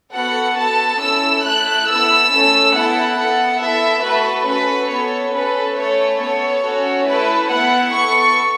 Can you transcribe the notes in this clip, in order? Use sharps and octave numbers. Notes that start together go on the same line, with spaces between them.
B3 F#4 A4 F#5
B3 A4 A5
C#4 E4 A4 E6
A3 E4 A4 F#6
B3 E4 A4 E6
A3 C#4 A4
B3 E4 A4 F#5
B3 A4
B3 E4 A4 E5
A3 F#4 A4 B4
C#4 F#4 A4 B4
B3 A4 C#5
C#4 A4 B4
A3 C#4 A4 C#5
B3 A4 C#5
C#4 F#4 A4
A3 E4 A4 B4
B3 E4 A4 F#5
B3 A4 C#6